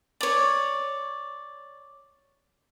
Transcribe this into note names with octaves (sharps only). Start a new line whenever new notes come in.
C#5 D5